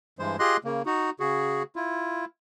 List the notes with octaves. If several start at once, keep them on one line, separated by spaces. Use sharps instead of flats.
G2 E3 G#3 C5
F4 G4 G#4 D#5 C6 F#6
C#3 A#3
D#4 F#4
C#3 F#4 G#4
E4 F4